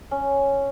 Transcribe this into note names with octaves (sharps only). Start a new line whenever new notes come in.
C#4